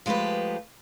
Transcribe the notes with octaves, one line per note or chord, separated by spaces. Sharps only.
F3 G#3 A3 G4 B4